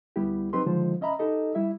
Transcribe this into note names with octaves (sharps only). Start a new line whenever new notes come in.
D2 G3 B3 E4 G4
F#3 C4 D#4 G4 B4 C6
D3 D#3 F3 G#3 F4 C5
C#4 D#5 E5 A#5 B5
D#4 G4 A4 D#5
G3 E4 E5